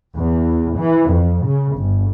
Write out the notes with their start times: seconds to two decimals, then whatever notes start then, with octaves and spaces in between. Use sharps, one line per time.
0.18 E2
0.79 E3
1.12 F2
1.45 C#3
1.77 G1